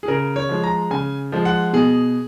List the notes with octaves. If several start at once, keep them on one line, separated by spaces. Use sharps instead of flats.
G#4
C#3 A#4
C#5
F3 G#3
A#5
C#3 G#5
F3 G#3
F#5
B2 G#4